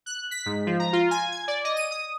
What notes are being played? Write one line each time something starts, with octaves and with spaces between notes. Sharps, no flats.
F#6
B6
G#2
F3
A#5
F4
G#5
G#6
D5
D#5
D#7
D#6